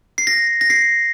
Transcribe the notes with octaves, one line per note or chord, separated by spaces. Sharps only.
C7
A#6
A#6
C7